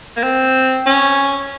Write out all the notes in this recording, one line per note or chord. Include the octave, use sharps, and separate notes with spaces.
A#3
C4
C#4